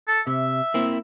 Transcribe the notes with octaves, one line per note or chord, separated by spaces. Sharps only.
A4
C3 E5
A#3 C4 E4